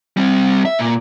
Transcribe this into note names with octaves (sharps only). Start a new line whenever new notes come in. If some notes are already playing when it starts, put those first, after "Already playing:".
G3 C4
E5
A#2